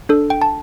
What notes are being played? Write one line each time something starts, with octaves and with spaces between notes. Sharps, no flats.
D4 A4
G5
A5